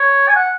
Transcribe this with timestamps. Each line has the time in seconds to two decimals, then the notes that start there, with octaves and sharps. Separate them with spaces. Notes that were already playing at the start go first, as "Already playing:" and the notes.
Already playing: C#5
0.28 G#5
0.36 F#5